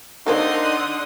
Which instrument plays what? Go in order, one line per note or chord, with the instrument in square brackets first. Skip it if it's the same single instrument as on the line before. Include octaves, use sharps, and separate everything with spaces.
[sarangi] D3 [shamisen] A3 A#3 C4 [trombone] D#4 [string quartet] F#5 C6 D#6